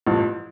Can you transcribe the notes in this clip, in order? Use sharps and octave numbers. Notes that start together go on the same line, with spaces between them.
A1 G2 F3